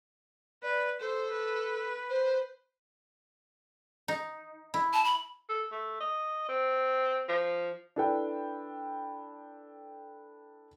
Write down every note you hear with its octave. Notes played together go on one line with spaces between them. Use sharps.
B4 D5
A4 C5
B4
C5
D#4
E4
A5
B5
A4
A3
D#5
C4
F3
D4 E4 A4 B4 G5